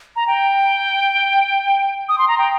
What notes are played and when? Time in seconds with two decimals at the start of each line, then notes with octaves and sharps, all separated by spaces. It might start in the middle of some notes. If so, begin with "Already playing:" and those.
0.16 A#5
0.27 G5
2.09 D#6
2.18 C6
2.28 A#5
2.38 G5